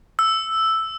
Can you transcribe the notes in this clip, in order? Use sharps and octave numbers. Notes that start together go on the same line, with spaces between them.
E6